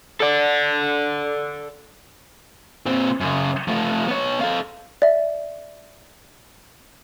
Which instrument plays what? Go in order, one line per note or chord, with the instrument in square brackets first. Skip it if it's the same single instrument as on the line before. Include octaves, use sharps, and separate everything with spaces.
[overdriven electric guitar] A4 D5
[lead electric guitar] A#2 C4
F#2 C#3
F3 A3
B3 C#5
A4 F5
[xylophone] D5 E5